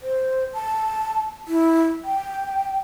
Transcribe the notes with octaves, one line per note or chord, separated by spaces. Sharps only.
C5
A5
E4
G5